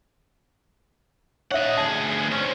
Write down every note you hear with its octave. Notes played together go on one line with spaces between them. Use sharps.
C#5 D#5 E5 F#5
D2 G#4 A5
C4 C#4